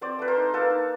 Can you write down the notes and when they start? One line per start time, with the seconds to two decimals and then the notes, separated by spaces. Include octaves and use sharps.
0.01 C4 C5 D5
0.19 A3 B4
0.28 A#4 C5
0.36 D#4
0.53 A#3 A4 B4
0.70 D#4